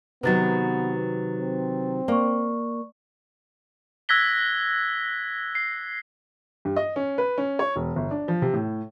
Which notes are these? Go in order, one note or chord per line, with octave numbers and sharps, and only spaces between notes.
C3 D#3 F#3 B3 B4 A6
C4
A#3 D5 C#6
E6 F#6 G#6 A#6 B6 G7
C7
G2
D#5
C#4
B4
C#4
C#5
E1
G1
D4
F3
C3
A2